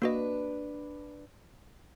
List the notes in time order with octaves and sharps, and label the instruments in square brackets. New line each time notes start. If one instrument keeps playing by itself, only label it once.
[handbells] A#3 F#4 D#5 [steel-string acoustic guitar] D4 B4